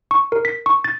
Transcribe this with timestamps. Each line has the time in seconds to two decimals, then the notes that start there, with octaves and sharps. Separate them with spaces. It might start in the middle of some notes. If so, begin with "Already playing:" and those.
0.11 C#6
0.32 A#4
0.45 B6
0.66 C#6
0.84 A6